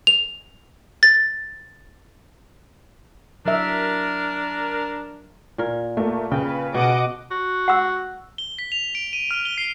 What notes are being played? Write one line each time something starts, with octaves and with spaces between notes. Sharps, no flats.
F7
A6
F#3 D4 A#4 E5
A#2 A#4
A3 A#3 A#4
C#3 B4 G5
B2 D#5 F#5 D6
F#4
F#5 E6
G7
B6
F7
D7
D#7
F6
G7
C7